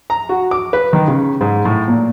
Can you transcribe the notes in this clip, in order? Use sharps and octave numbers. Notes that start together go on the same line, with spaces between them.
A#5
F#4
D6
B4
D#3
C#3
G#2
A2
A#2